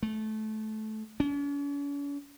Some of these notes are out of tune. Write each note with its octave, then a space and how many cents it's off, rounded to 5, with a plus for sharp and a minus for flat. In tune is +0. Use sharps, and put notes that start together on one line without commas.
A3 -20
C#4 +45